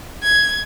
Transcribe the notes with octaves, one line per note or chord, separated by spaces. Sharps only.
G#6